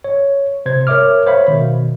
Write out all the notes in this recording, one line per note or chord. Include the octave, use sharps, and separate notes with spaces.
C#5
C3 C5 G#6
A#4 C#5 E5 D6 F6
C5 C#5 E5 F5 B5
B2 D#3